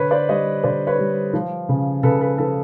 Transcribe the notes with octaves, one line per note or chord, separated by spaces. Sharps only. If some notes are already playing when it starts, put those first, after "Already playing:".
Already playing: D3 B4 C#5
C5 D5
G3 C#5 D#5
D3 C5 D5
B4 C#5
G3
F3
C#3
C#3 A4 B4
A4 B4
F3 A4 B4